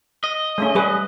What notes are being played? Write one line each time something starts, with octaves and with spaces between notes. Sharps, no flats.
D#5
G#3 A3 C#4
G3 G#4 B4